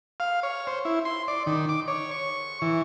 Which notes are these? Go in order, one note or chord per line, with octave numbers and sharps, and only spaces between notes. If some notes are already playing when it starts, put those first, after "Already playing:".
F5
C#5
C5
E4
C6
D5
D#3
D6
C#5
C#6
E3